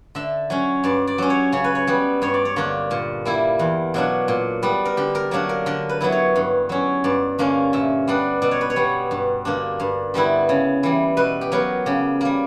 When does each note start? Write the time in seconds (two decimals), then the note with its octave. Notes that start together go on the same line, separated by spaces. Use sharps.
0.15 D3 E5
0.50 F#3 C#4
0.84 G2 D5
1.07 D5
1.18 F#3 C#4
1.30 C#5
1.53 C#3 C#5
1.64 B4
1.75 C#5
1.87 G3 B3
2.22 G2 C#5
2.34 D5
2.45 C#5
2.56 D3 A#3 D4
2.91 A#2
3.25 G3 A#3 E4
3.59 E2
3.94 B2 F#3 A#3 D4
4.28 A#2
4.63 G3 B3
4.85 A#4
4.97 D3 G4
5.15 A#4
5.31 F#3 A#3 D4 A#4
5.49 A#4
5.66 D3 A#4
5.89 B4
6.01 F#3 B3 E4
6.12 C#5
6.36 G2
6.69 F#3 C#4
7.04 G2 D5
7.39 D3 A#3 C#4
7.73 A#2 E5
8.08 G3 B3 D4
8.42 B2 D5
8.51 C#5
8.61 B4
8.70 C#5
8.76 G3 B3
9.11 G2
9.45 D3 A#3 D4
9.80 G2
10.14 D3 G3 B3 E4
10.49 C#3
10.83 E3 G3
11.17 B2 B4
11.41 G4
11.52 F#3 B3 A#4
11.86 C#3 G4
12.21 G3 A#3